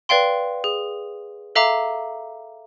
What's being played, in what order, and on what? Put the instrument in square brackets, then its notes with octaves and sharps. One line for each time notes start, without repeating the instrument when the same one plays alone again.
[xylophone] B4 D5 F5 G5 C6
G#4
A4 E5 F5 A#5 D6